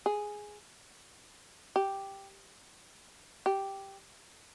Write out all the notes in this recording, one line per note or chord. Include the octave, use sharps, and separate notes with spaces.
G#4
G4
G4